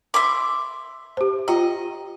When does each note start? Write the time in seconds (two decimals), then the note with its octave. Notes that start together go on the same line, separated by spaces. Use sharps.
0.14 E5 C6 D6
1.17 G4 C5
1.48 F4 D#5 G5 A#5